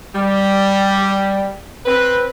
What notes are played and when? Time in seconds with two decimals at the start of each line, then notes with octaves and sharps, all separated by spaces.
0.14 G3
1.86 C4 B4